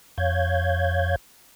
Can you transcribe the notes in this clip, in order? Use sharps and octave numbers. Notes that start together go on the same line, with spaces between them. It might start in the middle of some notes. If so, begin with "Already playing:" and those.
F2 C#5 F5 G6 G#6